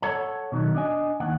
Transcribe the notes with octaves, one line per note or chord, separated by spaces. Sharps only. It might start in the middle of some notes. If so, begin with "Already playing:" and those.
A4 C#5 F#5 A5
B2 D#3 F#3
D4 D#5 G#5
D#2 F#5